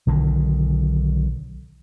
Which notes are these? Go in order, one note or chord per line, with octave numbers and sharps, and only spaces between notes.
B1 D3 D#3